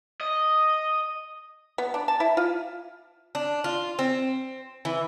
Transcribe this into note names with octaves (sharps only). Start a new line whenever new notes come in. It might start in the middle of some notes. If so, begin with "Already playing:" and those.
D#5
B3
D4
A5
E4
F4
D4
F4
C4
E3